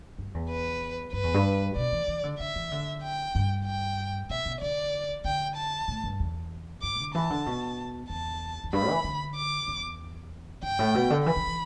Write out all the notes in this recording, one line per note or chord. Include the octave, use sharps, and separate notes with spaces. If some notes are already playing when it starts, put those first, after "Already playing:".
G2
E2
B4
G2 B4
E2
G2
B2 D5
E3
E3
D3
D3 E5
E3
D3
G5
G2
G5
B2 E5
B2
D3 D5
D3 G5
A5
A2
G2
E2
G2 D6
D3
E3 A5
D3
B2
E2 A5
E2
G2 B5
E3
D3
D6
E2
G2 G5
A2
B2
D3
E3 B5
E3
E3